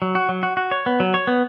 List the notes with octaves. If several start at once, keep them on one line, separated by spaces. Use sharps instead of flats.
F#3
F#4
F#3
F#4
F#4
C#5
B3
F#3
C#5
B3